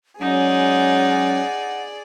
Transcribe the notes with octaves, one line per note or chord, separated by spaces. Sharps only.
F#3 G#3 C#4 D#4 G#4 D5 F#5